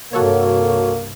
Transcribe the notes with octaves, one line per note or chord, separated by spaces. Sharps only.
C2 G2 A#3 F#4 A4 C#5